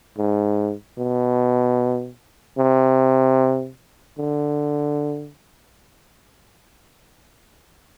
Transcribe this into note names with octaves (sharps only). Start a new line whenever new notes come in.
G#2
B2
C3
D3